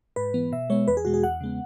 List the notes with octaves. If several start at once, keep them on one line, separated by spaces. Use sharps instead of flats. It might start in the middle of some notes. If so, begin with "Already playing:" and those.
G#2 B4
E3 B3
B2 E5
G#3 B3 C#5
E2 B4
G#4
B2 G#3 F#4
G#4
E2 F#5
C#3 G#3 B3